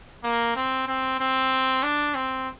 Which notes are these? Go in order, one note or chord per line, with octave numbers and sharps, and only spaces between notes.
A#3
C4
C4
C4
D4
C4